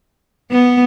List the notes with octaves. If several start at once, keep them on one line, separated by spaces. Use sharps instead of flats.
B3